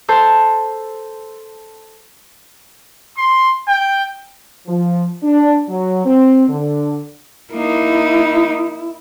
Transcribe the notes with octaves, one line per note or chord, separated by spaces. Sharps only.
A4 C5 A5
C6
G5
F3
D4
F#3
C4
D3
A#3 D#4 E4